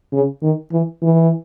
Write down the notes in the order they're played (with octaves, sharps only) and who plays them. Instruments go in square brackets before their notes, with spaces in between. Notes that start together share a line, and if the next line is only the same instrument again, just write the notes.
[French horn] C#3
D#3
E3
E3